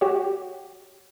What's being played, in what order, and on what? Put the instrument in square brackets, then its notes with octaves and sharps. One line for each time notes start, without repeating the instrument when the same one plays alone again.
[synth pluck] F#4 G4 C#5